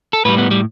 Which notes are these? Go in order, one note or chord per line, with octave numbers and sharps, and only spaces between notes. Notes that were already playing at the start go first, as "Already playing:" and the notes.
A4
A2 G3 B4
B3
G3